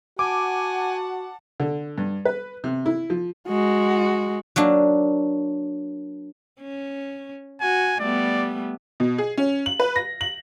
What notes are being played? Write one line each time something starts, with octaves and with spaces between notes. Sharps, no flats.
F#4 F#5 G#5 A5 D6
D3
G2
B4
C3
E4
F3
G#3 F#4
F#3 A#3 D4
C#4
F#4 G#5
G3 A3 B3 D5
B2
G#4
C#4
F#7
B4
A#6
F#7